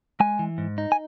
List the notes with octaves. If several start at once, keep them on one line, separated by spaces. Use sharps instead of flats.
G#3 G#5
E3
G#2
D#4
G#5